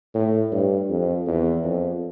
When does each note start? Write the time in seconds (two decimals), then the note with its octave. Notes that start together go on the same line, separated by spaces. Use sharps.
0.15 A2
0.52 G2
0.89 F2
1.27 E2
1.64 F2